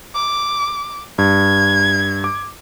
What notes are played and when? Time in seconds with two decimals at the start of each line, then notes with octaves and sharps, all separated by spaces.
0.15 D6
1.18 G2 G#6
2.24 D6